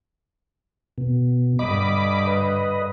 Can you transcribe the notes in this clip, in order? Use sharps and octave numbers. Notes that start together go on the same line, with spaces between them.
B2
G2 D3 D#5 B5 D6
B4 D#5